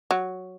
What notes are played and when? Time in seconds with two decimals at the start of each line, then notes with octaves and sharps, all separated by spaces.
0.11 F#3